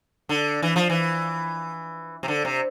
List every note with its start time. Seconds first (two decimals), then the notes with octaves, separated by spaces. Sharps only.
0.29 D3
0.62 E3
0.76 F3
0.89 E3
2.23 C3
2.28 D3
2.45 C3